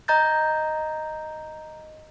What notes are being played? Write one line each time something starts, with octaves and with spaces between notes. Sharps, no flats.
D#5 A#5 G6 A6